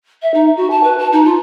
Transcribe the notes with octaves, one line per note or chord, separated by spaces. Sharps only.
E5
D#4
F#4
A5
B4
A5
D#4
F4